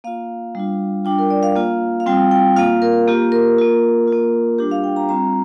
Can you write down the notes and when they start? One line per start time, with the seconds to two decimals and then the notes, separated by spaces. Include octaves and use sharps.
0.04 A#3 F4 F5
0.55 G3 D4 F4
1.05 G3 D4 F4 G5
1.19 A#4
1.30 D5
1.43 F5
1.56 A#3 F4
2.00 F5
2.06 G3 C4 F4 G5
2.31 G5
2.56 A#3 F4 F5
2.82 A#4
3.08 A#3 F4 G4
3.32 A#4
3.58 A#3 F4
4.08 A#3 F4
4.58 G3 D4 F4 G4
4.71 F5
4.84 G5
4.96 A#5
5.09 G3 C4 F4 A#5